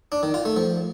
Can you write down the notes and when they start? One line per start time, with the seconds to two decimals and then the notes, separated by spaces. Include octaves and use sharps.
0.12 D4
0.23 D#3
0.34 F4
0.45 A3
0.56 F3